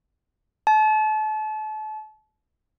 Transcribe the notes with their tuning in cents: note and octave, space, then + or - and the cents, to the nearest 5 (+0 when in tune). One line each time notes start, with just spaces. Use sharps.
A5 -35